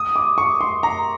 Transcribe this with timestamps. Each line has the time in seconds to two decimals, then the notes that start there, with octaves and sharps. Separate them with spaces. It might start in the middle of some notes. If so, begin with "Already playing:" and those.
Already playing: D#6
0.16 D6
0.38 C#6
0.61 C6
0.83 A#5